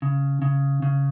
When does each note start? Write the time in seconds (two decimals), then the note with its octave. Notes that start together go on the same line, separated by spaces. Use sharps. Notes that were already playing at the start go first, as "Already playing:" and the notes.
0.02 C#3
0.42 C#3
0.82 C#3